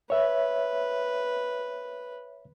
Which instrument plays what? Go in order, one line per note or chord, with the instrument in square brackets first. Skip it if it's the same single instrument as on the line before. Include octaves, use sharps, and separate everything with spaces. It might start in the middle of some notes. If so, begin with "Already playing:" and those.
[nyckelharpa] B4 [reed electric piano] C#5 E5